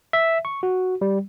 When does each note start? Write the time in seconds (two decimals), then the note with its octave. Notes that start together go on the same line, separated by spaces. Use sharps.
0.13 E5
0.45 C#6
0.63 F#4
1.01 G3